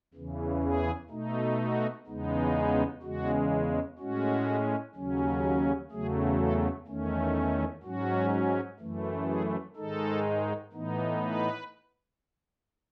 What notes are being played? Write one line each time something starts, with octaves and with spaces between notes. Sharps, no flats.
E2 C#3 E3
G#4
B2 A3 D#4
F#4
E2 C#3 G#3 B3 D#4
G#4
E2 C#3 G#3 F#4
A2 G#3 C#4 F#4
D#2 C#3 F#3 C#4
E2 C#3 F#3 A3 G#4
A4
E2 D#3 A3 C#4
G#2 F#3 C#4 F#4
F#2 E3 A3
G#4
G#2 D#3 G#3 D#4 A4
A2 E3 B3 D#4
B4